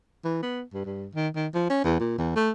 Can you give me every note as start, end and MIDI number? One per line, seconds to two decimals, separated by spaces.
0.24 0.41 52
0.42 0.62 59
0.73 0.84 43
0.85 1.07 43
1.15 1.28 51
1.35 1.47 51
1.54 1.65 53
1.70 1.81 61
1.84 1.99 40
2.00 2.14 46
2.18 2.32 40
2.36 2.50 57